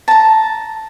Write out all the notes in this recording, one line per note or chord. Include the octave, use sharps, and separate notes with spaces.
A5 A#5